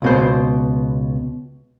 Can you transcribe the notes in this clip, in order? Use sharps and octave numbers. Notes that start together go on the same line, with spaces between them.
C#2 B2 C5